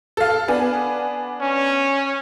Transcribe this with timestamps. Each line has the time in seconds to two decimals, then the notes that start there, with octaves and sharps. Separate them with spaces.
0.17 A4 F5
0.48 B3 D4 G#5
1.41 C#4